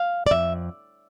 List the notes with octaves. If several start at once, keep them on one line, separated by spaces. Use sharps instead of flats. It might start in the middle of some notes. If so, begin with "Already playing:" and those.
Already playing: F5
D5
F2 E5